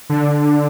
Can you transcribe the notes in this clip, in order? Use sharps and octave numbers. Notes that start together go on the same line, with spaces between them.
D3